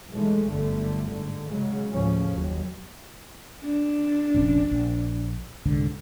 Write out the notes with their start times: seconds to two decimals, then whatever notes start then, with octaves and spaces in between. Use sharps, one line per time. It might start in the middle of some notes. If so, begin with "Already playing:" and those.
0.11 B1 E3 G#3 A3
0.51 G1 F#2 D3 A3
1.09 G#2 D3
1.49 C#3 F#3 G#3
1.91 D2 A2 C#3 F3 C#4
2.33 F#1 D#2 F#3
3.63 D4
4.34 F1 A#1 C#4
4.71 A#1
5.65 C2 G#2 D3